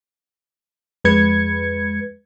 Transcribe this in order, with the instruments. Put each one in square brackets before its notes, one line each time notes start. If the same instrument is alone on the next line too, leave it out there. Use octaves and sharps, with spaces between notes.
[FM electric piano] F2 G#3 B4 G#6 C#7